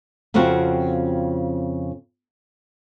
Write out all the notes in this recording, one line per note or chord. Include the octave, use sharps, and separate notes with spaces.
F2 C#3 C4 F4 F#4